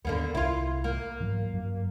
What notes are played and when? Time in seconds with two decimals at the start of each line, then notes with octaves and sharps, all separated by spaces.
0.05 D#2 D3 A#3 B3
0.35 C2 E4 F4
0.84 A#3
1.20 G#2 E3 F#3
1.53 G2 F#3